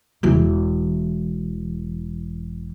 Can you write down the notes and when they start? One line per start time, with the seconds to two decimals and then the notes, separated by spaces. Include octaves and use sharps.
0.23 E1 E3